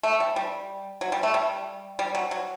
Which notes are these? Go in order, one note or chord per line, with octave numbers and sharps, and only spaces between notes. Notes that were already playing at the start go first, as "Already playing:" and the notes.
A3
G3
G3
F#3
G3
A3
G3
G3
F#3
F#3